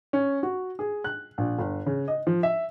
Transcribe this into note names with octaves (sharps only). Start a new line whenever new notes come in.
C#4
F#4
G#4
F#6
A#1
G1
C#3
D#5
F3
E5